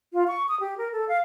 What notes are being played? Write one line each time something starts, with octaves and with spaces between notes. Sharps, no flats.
F4
C#6
D#6
G4
A#4
A4
F5